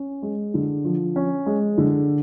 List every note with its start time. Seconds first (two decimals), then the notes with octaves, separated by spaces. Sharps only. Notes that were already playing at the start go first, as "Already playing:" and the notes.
Already playing: C#4
0.22 G#3
0.54 D3
0.85 F3
1.16 C#4
1.46 G#3
1.78 D3